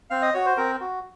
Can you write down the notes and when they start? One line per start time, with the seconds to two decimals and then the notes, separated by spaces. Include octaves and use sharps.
0.10 C4 F5
0.22 D#5
0.34 F#4 C#5
0.46 C5
0.57 C4 A#4
0.81 F#4